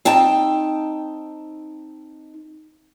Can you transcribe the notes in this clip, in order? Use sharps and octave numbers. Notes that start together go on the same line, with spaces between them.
C4 D#4 G5 A5